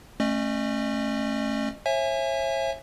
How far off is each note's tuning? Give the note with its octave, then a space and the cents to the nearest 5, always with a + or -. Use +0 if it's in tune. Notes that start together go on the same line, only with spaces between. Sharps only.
A3 +0 C#4 -25 D#5 -40
C#5 -40 E5 +10 G#5 +0